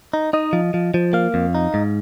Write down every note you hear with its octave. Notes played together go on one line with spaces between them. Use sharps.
D#4
D#4 D#5
F3
F3
F3
A#3 F5
F2
D#4
G#2